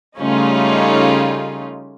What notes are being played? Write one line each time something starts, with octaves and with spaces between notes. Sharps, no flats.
C#3 G3 A3 C#4 D#4 F4